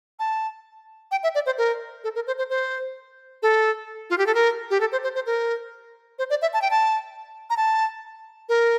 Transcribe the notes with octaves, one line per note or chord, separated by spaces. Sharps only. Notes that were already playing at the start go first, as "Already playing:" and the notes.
A5
G5
E5
D5
C5
A#4
A4
A#4
C5
C5
C5
A4
F4
G4
A4
A#4
G4
A4
C5
C5
C5
A#4
C5
D5
E5
A5
G5
A5
A#5
A5
A#4